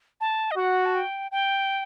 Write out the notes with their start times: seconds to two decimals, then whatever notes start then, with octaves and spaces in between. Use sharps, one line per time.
0.21 A5
0.51 D#5
0.57 F#4 F#5
0.85 A5
0.95 G5
1.31 G5